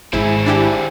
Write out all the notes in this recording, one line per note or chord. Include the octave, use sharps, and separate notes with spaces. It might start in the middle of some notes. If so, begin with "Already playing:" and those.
G#1 G#2 C4 E4 G#4
D4 E4 G4